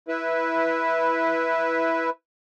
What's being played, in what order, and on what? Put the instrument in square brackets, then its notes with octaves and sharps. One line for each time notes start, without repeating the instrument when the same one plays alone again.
[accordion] E4 B4